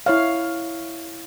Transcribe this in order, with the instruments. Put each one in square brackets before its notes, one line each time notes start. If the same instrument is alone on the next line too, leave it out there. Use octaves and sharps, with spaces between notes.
[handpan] E4 C#5 F5